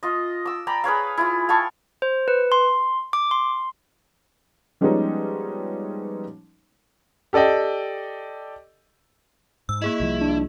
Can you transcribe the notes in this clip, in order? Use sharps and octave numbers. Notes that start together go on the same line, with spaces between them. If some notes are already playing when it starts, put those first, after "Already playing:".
F4 D#5
D6 E6
D5 G5 A#5 B5
G#4 B4 C#5 F5
E4 F4
F5 G5 A5 C#6
C5
B4
C6
D6
C6
F3 G3 G#3 B3 C#4 D#4
G4 A4 D5 D#5 G5
G#2 E6
A#3 E4 G#4 D#5
C2 F3 G3
D4